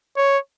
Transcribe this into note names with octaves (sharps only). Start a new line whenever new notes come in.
C#5